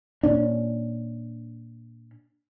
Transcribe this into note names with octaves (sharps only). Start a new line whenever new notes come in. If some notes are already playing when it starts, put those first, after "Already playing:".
A#2 C#4 D4